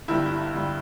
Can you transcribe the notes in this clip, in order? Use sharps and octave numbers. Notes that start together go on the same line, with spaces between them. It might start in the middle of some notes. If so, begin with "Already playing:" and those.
G1 G2 G3 E4
E4
G1 G2 G3